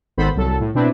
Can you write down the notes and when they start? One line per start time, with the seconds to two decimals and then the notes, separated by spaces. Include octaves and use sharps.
0.17 G#1 D#3 B3 A4 C5 B5
0.36 C2 F#3 A4
0.60 A2
0.75 B2 C4 D4 E4 B4